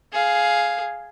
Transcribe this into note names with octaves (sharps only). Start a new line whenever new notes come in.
G#4 F5